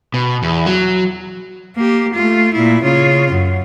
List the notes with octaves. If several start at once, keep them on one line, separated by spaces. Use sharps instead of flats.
B2
E2
F#3
A#3 G4
A3 F4
A#2 E4
C#3 F4
F#2